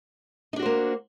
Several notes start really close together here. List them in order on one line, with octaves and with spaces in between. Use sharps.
D#4 D4 F#4 C5 A#3